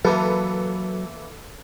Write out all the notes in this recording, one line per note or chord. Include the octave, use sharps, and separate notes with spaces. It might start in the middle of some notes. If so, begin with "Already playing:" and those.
E3 F#3 A#3 F4 A4 B4